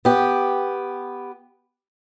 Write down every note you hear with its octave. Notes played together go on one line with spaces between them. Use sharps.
B3 G4